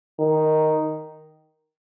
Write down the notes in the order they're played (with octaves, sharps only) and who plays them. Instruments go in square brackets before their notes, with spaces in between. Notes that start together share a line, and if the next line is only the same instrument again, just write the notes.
[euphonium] D#3